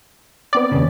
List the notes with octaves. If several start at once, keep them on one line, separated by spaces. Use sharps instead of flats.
B3 C4 D5
D#2 G#2 C#3